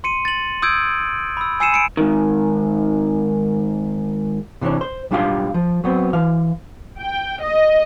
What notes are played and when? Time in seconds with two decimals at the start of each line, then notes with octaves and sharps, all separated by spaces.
0.04 C6 C#7 D#7
0.25 A6 F#7
0.62 D#6 E6 G6 G#6 D7
1.37 B5 E6
1.60 G#5 E6 C7 C#7 D#7 E7
1.72 B5 C#7 D7
1.97 G#2 D#3
4.61 C3 E3 A#3 C#4 D4
4.81 C5
5.11 B1 G3 D4 F4 G4 F5
5.54 F3
5.84 F#3 B3 C4
6.13 E3 F5
7.00 G5
7.41 D#5